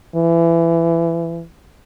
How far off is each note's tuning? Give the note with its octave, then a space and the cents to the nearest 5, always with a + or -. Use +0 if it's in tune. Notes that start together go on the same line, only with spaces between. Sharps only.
E3 +25